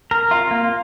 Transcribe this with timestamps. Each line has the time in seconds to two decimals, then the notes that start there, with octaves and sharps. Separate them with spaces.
0.11 A#4
0.31 F4 F5
0.51 A#3